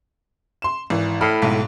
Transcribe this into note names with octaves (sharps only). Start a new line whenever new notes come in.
C6 E7
G#1 E3
A2 B5 F6
B1 G#2